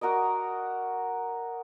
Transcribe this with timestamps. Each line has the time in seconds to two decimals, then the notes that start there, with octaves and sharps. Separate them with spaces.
0.01 F#4 A#4 D5 D#5